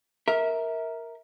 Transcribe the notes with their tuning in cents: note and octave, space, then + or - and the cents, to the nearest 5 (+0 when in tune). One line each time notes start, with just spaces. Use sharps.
A#4 +0 E5 -25